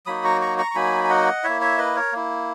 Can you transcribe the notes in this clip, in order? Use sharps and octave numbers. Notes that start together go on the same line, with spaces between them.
F#3 A#3 D#4 F#4 B5 D#6
A#5 C#6
A#5 C#6
A#5 C#6
C#6
F#3 A#3 D#4 F#4 G#5 B5
G#5
D#5 F#5
A#3 E4 C#5 E5
C#5 E5
B4 D#5
A#4 C#5
A#3 E4